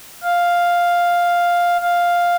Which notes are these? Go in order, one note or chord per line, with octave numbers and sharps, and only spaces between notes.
F5
F5